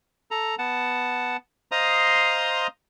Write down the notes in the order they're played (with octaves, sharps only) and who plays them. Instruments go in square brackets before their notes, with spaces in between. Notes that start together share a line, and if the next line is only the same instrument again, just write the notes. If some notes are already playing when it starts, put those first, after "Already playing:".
[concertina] A4 A#5
B3 F#5 A5
C5 D#5 F5 A#5 C6 D#6